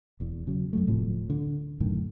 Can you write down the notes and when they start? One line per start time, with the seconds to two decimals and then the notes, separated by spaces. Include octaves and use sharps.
0.20 E1 E2
0.47 C#3 F#3
0.73 F#2 F#3 A3
0.87 D1 A2 C3 F3
1.30 D3
1.80 F#2 A2 D3 D#3